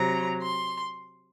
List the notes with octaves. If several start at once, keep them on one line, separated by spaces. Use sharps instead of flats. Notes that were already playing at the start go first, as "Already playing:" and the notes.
Already playing: C3 F#3 A#5
C6